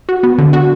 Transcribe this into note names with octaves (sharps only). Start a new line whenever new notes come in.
F#4
B3
D3
F#4